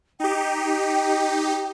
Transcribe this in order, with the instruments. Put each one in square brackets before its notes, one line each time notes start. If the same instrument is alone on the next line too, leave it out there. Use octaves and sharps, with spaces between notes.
[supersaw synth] D#4 G4 [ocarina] G5